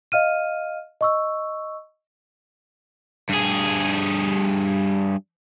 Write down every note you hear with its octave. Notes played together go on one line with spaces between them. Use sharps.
D#5 F5 F6 D#7
D#5 C#6 E6
G2 G#4